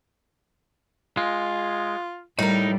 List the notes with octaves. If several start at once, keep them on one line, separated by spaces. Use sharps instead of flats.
G#3 F4
A2 G3 D#4 A#4